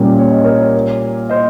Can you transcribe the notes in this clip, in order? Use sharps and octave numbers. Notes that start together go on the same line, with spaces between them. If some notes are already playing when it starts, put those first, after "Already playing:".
Already playing: A#2 G3 A#3 C#4 G4 A#4
C#5
D#5
A#4 C#5
C5 D#5